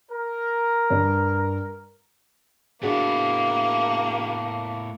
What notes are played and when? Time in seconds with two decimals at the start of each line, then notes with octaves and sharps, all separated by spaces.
0.10 A#4
0.90 G2
2.83 A2 A#3 B3 D4 F#4 G#4